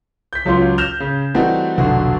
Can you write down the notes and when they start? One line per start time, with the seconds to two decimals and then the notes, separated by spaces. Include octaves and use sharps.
0.33 G6 B6
0.45 C#2 F#3 C#4 F4 C6
0.78 F6 G6 A#6 E7 F7
1.00 C#3
1.34 E3 G3 A3 C4 D#4 F#4
1.77 F1 B1 D3 F#4